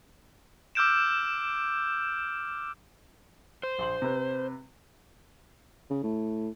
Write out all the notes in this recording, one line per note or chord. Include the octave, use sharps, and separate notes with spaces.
D6 E6 F6 G6 D7 E7
C5
A#1 C6 F#7
C3 B4
C#3
A2